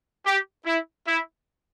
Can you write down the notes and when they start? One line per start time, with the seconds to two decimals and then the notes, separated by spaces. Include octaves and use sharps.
0.26 G4
0.66 E4
1.07 E4